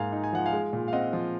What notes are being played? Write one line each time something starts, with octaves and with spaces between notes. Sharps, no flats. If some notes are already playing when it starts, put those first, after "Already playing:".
Already playing: G#2 A#3 F5 G#5
D#4
G#5
F3 F#5
F5 G#5
G#3
A#2
F5
C4 D#5 F#5
F3